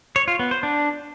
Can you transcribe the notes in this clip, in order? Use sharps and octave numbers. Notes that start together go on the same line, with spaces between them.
C#5
F4
B3
C5
D4